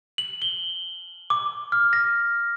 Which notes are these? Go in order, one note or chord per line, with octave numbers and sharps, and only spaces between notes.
F#7
G7
D6
F6
A#6